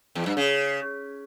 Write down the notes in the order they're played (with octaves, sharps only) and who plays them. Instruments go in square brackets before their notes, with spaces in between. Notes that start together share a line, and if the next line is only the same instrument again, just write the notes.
[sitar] E2
G2
C#3